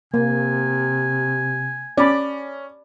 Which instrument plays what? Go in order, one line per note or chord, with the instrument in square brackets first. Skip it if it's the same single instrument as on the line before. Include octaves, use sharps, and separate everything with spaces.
[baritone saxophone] C3 [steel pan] A#3 [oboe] G#5
[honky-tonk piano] C#4 [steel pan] D5 B5